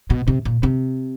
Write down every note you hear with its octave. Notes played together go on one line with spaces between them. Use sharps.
B2
C3
A#2
C3